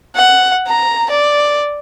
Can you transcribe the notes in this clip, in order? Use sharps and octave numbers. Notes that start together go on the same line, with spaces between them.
F#5
A#5
D5